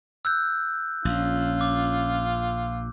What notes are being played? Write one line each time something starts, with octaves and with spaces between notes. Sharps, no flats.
E6 F#6 G6
A#1 C#4 F4
D6